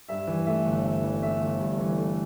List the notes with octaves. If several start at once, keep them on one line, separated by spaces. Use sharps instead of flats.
G2 E5
E3
A3 E5
G1
G2 E5
E3
A3 E5
G1
G2
E3
A3